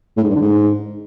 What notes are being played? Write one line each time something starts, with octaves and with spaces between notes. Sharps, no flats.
A2
G#2
G2
D3
G#2